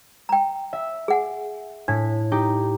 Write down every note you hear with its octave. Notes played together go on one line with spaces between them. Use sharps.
G5 A#5
E5
G#4 F#5 G#5
A2 D4 B6
D#4 G4